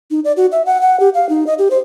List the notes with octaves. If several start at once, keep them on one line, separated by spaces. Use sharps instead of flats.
D#4
D5
F#4
E5
F#5
F#5
G4
F5
D#4
D#5
G4
C5